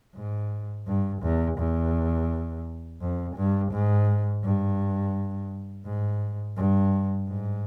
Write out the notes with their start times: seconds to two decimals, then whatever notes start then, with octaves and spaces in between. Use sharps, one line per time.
0.15 G#2
0.87 G2
1.23 E2
1.58 E2
3.01 F2
3.36 G2
3.72 G#2
4.44 G2
5.86 G#2
6.57 G2
7.29 G#2